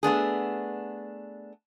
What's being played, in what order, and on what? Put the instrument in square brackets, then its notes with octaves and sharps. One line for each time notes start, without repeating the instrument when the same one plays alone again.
[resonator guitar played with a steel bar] A3 B3 D4 G#4